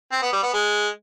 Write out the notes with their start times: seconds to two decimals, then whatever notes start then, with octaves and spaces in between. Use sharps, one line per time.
0.12 C4
0.22 B3
0.33 G3
0.43 B3
0.53 G#3